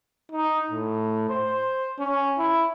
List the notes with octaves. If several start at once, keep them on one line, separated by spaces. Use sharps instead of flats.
D#4
A2
C5
C#4
E4